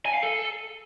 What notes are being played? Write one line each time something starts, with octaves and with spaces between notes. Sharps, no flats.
G#5
F5
A4